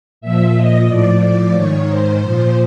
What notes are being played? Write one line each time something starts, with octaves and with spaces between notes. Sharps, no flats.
A#2 F3 E5
D#5
A2 F3 D5
D5
G#2 D#3 C#5
C5
A#2 F3